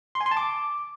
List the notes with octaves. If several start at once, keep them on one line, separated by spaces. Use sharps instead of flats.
C6
G#5
C6
A5
D6